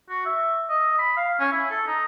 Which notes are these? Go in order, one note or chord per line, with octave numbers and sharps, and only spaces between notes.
F#4
E5
D#5
B5
F5
C#4
E4
A4
D#4